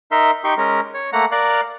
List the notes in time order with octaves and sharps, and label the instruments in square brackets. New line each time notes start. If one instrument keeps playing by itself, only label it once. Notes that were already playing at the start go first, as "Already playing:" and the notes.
[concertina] D#4 A#4 E5 C6
D#4 G4 C6 C#6
G#3 C#4 A#4
C#5
A3 A#3 F#5 A#5
A#4 D5 F5 F#6